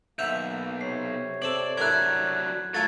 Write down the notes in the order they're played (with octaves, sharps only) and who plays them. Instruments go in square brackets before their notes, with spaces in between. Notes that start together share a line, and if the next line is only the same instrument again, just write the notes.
[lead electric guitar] B1 [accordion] A#3 [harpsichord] E5 F#5 [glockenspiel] G6 F7
[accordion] C3 C#5 [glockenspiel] C7
[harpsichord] C4 A4 [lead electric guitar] D5 [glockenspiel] E7 F#7
[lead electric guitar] F#3 D4 [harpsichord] E4 A4 A#4 [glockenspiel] F#6 G#6
[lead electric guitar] F#3 [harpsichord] A3 F4 A4 [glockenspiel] G#6 A6